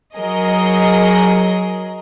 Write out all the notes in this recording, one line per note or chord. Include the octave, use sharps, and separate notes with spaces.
F#3 G#4 A#4 D#5